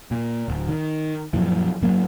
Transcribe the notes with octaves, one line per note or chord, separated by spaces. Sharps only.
A#2
D1
D#3
F#2 A#2 E3 F3
G2 F#3 A#3